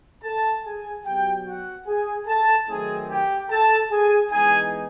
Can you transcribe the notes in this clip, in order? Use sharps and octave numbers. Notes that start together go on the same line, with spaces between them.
A4 A5
G#4 G#5
B2 F#3 B3 G4 G5
F#4 F#5
G#4 G#5
A4 A5
D#3 F#3 A3 C4 D#4 G#4 G#5
G4 G5
A4 A5
G#4 G#5
E3 G#3 B3 D#4 G#4 G#5